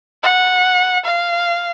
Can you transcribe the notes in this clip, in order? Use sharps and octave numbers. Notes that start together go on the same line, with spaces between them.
F#5
F5